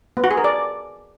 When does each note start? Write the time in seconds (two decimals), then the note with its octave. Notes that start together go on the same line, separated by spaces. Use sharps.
0.17 B3
0.24 F#4
0.31 G#4
0.37 A#4
0.44 D5